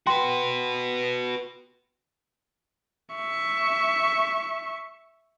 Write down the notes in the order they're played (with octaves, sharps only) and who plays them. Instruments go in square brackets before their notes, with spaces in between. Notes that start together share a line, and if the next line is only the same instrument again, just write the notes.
[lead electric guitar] F#4 B4 [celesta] G5 C6
[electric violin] E5 C#6